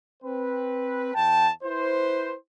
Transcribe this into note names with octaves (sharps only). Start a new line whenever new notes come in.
C4 B4
E2 G5 A5
E4 B4 C5